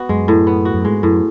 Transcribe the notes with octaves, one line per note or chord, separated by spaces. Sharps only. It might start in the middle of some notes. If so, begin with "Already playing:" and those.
Already playing: B3 F#4
F#2 G#3
A2
B3
F#4
F#2
G#2 G#3
F#2 A2